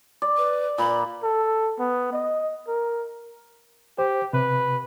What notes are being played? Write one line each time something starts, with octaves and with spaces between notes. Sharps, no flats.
D5
B4
A#2 B5
A4
B3
D#5
A#4
G4 C5
C3 B4